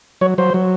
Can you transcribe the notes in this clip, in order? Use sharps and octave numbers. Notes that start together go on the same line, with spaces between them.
F#3 C#5
F#3 C5
F#3